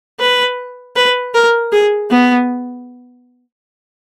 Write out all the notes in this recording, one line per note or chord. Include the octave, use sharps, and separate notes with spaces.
B4
B4
A#4
G#4
B3